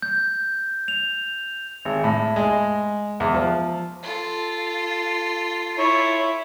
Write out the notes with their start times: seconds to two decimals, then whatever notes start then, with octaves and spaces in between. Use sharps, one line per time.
0.02 G6
0.88 F7
1.85 G#1
2.04 A2
2.36 G#3
3.20 E2
3.34 F3
4.03 F4 A4
5.78 E4 C#5